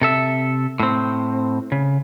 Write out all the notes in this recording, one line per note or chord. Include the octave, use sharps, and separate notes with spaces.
C3 A4 E5
A2 C4
C#3